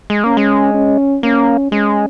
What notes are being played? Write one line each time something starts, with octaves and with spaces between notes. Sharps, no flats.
G#3
A#3 C#4
G#3
C#4
A#3 C#4
G#3 C#4